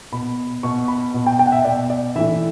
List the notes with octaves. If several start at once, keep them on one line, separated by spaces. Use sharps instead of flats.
B2 B5
B2 C#6
B5
B2
G5
G5
F#5
E5
B2 D5
D5
A2 E3 E5